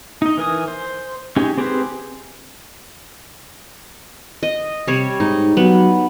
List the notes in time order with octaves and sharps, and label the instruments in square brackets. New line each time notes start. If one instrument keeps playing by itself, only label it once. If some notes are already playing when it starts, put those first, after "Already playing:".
[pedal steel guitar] D#4 D#5
E3 A#4 G#5 D#6
C5
G#3 C#4 D#4 G4
C4 G4 G#4 B4 C5
[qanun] D#5
[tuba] C3 [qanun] G3 C#5
[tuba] G#2 [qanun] D#4
[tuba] F#3 [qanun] B3